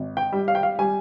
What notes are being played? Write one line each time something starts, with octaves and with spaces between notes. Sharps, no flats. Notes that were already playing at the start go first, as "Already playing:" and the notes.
Already playing: G#1
G5
G3
F5
G5
F5
G3 G#5